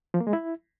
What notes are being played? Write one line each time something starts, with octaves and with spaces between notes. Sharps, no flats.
F3
A#3
G#3
E4